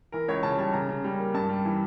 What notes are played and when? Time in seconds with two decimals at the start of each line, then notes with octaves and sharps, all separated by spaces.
0.12 E3 A#4
0.28 C#2 C#5
0.43 C#3 A5
0.58 G3 A5
0.73 C#3 A#5
0.89 C#3
1.04 G3
1.19 A#3
1.34 G2 A5
1.49 G3
1.65 E3